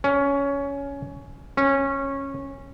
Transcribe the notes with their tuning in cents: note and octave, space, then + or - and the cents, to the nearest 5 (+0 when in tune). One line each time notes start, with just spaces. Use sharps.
C#4 +15
C#4 -15